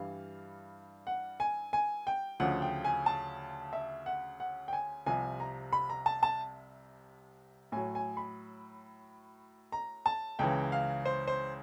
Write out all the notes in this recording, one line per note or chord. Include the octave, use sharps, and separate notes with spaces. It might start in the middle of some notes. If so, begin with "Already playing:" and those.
Already playing: G2 E3 G3 F5
F#5
G#5
G#5
G5
D2 C#3 F3 F#5
G5
G#5
A5
E5
F#5
F#5
G5
G#5
C2 C3 F3 G#5
A#5
B5
A#5
A5
A5
A2 F#3 G#5
G#5
B5
A#5
A5
C#2 C#3 E3 G5
F5
C5
C5